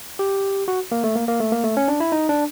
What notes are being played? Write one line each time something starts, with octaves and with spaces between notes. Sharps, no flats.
G4
F#4
A#3
A3
A#3
A#3
A3
A#3
A3
C#4
D4
E4
D#4
D4